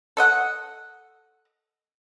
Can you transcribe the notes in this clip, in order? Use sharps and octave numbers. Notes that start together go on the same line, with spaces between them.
A4 D#5 F#5